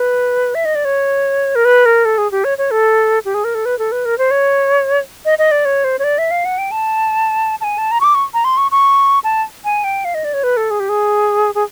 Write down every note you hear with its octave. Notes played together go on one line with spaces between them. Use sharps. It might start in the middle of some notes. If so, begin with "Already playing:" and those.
Already playing: B4
E5
D#5
D5
C#5
A#4
B4
A#4
A4
G#4
G4
C#5
C#5
A4
G4
G#4
A#4
A4
B4
A4
B4
A#4
C5
C#5
D#5
D#5
D5
C#5
C5
C#5
D5
E5
F5
F#5
G5
A5
A5
G#5
A5
A#5
C#6
D6
C#6
A#5
C6
C#6
C#6
A5
G#5
G5
F5
D#5
D5
C#5
B4
A4
G#4
G4
G#4
G#4